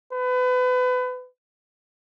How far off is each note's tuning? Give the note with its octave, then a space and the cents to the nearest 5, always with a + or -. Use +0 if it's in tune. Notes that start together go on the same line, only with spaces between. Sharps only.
B4 +30